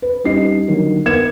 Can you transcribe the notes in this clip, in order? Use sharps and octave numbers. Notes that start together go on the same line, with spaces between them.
B4
G3 C#4 D#4 G4 D#5 C7
D3 D#3 F#3 A#3
B3 A#4 G#6 C#7 E7